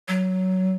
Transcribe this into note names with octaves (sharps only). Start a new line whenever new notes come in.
F#3